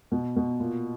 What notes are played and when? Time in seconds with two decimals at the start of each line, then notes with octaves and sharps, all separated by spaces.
0.12 B2
0.36 B2
0.59 A#2